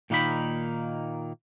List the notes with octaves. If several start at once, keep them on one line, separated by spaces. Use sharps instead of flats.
A#2 D#3 A#3 D#4 B5